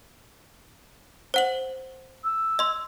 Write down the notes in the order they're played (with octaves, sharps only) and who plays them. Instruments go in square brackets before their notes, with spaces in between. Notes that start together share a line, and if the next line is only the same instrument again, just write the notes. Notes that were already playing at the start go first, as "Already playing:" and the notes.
[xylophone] C5 F#5 F#7
[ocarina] E6
[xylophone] D#5 C6